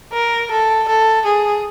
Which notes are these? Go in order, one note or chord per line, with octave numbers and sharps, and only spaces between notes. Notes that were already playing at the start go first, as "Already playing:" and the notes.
A#4
A4
A4
G#4